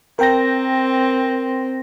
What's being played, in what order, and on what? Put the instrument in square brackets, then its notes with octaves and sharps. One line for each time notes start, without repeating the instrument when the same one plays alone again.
[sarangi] C4 [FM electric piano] A#4 G5 A#6